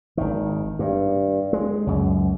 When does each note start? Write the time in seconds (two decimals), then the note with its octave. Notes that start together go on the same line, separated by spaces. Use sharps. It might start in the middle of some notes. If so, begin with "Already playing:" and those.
0.17 G#1 D#3
0.79 G2
1.53 G#3
1.87 C#2 F#2